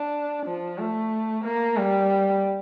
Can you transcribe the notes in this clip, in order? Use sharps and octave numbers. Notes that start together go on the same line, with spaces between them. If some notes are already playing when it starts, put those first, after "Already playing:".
Already playing: D4
F3
A3
A#3
G3